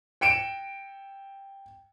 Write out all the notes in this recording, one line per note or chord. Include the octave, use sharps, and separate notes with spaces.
G5 C#7 D7 E7